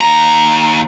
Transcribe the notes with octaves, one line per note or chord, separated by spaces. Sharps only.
D#2 A#5